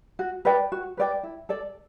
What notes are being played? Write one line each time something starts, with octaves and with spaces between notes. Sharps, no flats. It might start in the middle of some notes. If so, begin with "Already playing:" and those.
F#4
B4 D5 G5
F#4
B4 D5 G5
E4
A4 D5